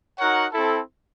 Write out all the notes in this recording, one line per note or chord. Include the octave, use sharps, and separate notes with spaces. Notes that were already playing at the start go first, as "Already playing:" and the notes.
D#4 F#4 A#4 C#5 F#5
C4 E4 A4